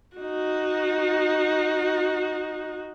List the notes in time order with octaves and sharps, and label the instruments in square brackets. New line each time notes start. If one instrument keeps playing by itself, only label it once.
[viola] D#4 F#4